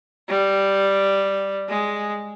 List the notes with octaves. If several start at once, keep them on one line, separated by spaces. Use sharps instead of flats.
G3
G#3